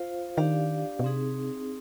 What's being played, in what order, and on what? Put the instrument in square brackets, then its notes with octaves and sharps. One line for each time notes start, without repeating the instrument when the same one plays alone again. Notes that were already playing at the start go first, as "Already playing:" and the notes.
Already playing: [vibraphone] F4 C5 F5
[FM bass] D#3 [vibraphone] D4 G4 D5 F5
[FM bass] B2
[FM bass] C3 [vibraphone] C4 D#4 G#4